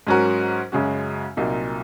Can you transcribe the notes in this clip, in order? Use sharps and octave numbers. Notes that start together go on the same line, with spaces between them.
G#2 F#3 C#4 F#4 A#4
F#2 C#3 G#3 C#4 F#4
C2 A#2 F#3 A#3 D#4